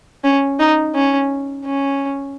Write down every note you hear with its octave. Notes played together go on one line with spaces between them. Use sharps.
C#4
D#4
C#4
C#4